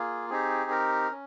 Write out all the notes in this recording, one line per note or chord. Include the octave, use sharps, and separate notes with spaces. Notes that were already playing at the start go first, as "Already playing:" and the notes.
Already playing: A#3 F4 G#4
C4 D#4 G4 G#4
A#4
C#4